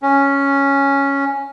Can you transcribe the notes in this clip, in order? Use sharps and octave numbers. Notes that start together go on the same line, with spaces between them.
C#4